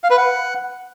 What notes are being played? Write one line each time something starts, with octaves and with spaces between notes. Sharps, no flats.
F5
B4
F#5